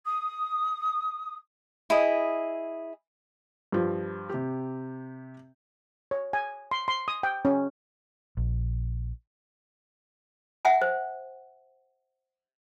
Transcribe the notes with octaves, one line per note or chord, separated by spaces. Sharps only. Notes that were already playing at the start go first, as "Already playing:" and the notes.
D#6
E4 G#4 D#5
G2 F3
C3 G4
C#5
G#5
C6
C6
D#6
G5
C#4
A#1
E5 F#5 G#5
C5